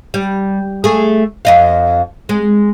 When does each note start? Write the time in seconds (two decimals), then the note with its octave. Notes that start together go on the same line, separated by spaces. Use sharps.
0.14 G3
0.84 A3 G#4
1.45 F2 D#5 F5
2.29 G#3